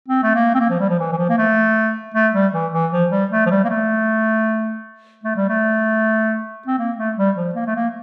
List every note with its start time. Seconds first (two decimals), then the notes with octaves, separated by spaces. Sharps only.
0.08 C4
0.23 A3
0.35 A#3
0.55 C4
0.60 A#3
0.70 F3
0.79 G3
0.89 F3
0.99 E3
1.12 E3
1.18 F3
1.29 A#3
1.38 A3
2.14 A3
2.34 G3
2.53 E3
2.73 E3
2.92 F3
3.11 G3
3.31 A3
3.46 F3
3.50 G3
3.64 A#3
3.69 A3
5.24 A3
5.36 G3
5.49 A3
6.67 C4
6.79 A#3
6.98 A3
7.17 G3
7.36 F3
7.55 A#3
7.66 A3
7.76 A#3